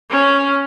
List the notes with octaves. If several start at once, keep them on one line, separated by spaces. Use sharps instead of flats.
C#4